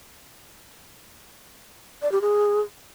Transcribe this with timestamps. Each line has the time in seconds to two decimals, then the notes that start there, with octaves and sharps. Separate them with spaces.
2.02 D5
2.12 G4
2.21 G#4